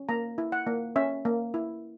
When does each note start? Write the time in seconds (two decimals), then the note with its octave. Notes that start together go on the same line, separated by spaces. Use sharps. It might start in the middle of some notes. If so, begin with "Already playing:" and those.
Already playing: C#4
0.09 A#3 A#5
0.38 E4
0.52 F#5
0.67 A#3
0.96 C#4 E5
1.25 A#3
1.54 E4